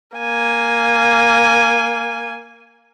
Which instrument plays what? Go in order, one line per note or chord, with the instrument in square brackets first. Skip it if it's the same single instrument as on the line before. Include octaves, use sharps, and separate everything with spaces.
[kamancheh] A#3 G#5